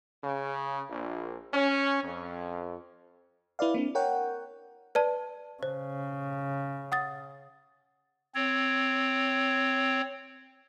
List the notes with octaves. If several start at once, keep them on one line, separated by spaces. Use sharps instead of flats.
C#3
A#1
C#4
F2
E4 B4 D5 F5
A#3 C4 D4
A#4 C#5 F#5 G5
B4 D5 A5
C#3 C5
F#5 D#6 A6
C4 C#5